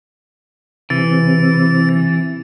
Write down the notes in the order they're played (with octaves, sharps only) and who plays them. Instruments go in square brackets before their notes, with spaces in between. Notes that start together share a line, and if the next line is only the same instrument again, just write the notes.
[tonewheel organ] C3 [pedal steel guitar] E3 [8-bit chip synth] A6